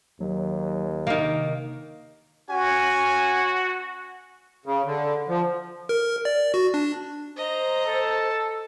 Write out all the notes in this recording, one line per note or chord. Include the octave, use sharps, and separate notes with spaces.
D#2 F#3
C3 D#3 A#3
C#4 F#4 G#5
C#3
D3
F3
A#4
D5
F#4
D4
C5 D#5 A#5
A4 A5